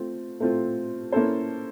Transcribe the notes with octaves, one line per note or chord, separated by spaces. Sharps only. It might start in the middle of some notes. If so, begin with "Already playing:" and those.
Already playing: A3 C4 F4
A3 C4 F4
A#3 C#4 E4 A4 C5